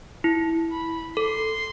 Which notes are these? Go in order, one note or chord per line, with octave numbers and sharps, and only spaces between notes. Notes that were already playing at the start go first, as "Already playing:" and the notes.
E4
B5
A4 C6